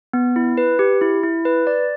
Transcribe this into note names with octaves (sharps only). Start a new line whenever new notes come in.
B3
E4
B4
G4
E4
E4
B4
D5